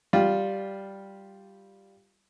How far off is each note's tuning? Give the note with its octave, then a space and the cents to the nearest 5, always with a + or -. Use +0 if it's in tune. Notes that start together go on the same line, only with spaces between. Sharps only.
G3 -5 F4 +0